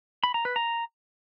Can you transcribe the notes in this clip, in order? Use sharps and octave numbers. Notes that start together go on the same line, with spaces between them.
B5
A#5
B4
A#5